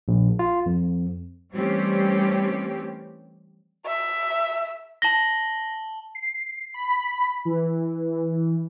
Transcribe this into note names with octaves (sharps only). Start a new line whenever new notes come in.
A#1
F4
F2
E3 G3 A3 C4 C#4 G4
E5
A5 A#6 F#7 G7
C7
B5
E3